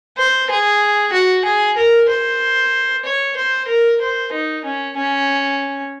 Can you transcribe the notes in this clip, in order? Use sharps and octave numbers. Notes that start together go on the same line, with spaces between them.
C5
G#4
F#4
G#4
A#4
C5
C#5
C5
A#4
C5
D#4
C#4
C#4